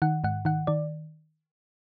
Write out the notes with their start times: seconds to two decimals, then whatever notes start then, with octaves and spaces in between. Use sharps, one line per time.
0.02 D#3 F#5
0.24 G#2 F#5
0.45 D#3 F#5
0.67 D#3 D5